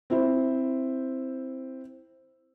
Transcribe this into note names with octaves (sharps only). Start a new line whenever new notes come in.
C4 E4 C5